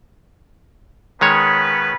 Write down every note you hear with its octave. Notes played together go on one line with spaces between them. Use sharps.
D#3 G#3 B3 C#4 B4 C#5